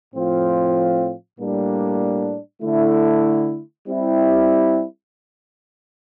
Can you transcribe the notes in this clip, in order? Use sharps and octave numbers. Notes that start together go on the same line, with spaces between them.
A2 F3 C4 F4
A2 G3 A#3 D4
D3 A3 E4
G3 C4 E4 G4